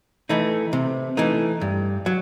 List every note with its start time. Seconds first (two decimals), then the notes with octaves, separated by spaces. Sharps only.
0.29 E3 A3 D#4
0.73 C3
1.17 E3 A3 D#4
1.61 G2
2.06 F#3